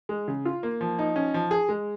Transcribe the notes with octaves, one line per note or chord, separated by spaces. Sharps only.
G#3
C#3
F4
A#3
F3
D#4
C#4
F3
G#4
G#3